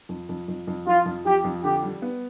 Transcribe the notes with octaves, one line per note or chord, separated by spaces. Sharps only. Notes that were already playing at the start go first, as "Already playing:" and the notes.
F2
F2
F2
F2
F3 F4
F2
F3 G4
F2
D3 G4
G3
B3